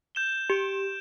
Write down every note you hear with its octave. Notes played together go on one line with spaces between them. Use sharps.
G6 E7 G7
G4 D7 G7